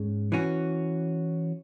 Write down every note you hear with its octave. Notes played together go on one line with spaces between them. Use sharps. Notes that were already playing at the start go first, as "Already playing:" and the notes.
Already playing: G#2 G#3 C#4
E3 C#4 F#4